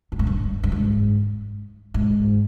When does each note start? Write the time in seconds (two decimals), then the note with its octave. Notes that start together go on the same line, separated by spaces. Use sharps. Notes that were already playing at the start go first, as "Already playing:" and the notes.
0.12 G2
0.19 G#2
0.27 G2
0.63 G2
0.72 G#2
1.94 G#2